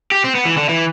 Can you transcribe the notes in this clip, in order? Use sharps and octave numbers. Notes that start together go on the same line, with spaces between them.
G4
C4
B3
E3
D3
E3